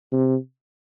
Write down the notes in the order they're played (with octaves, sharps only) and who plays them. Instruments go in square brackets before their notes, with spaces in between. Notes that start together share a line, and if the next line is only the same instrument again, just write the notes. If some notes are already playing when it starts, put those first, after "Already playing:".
[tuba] C3